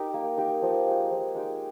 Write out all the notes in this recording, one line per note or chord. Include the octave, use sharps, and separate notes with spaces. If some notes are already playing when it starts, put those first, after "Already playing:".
Already playing: D#4 G4 A#4
A#3
D#4 G4 A#4
F3
G#3 D#4 G4
F3
G#3 D#4 G4